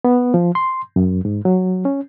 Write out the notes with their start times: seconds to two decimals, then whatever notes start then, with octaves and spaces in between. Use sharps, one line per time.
0.04 B3
0.34 F3
0.55 C6
0.96 F#2
1.25 G#2
1.45 F#3
1.85 C#4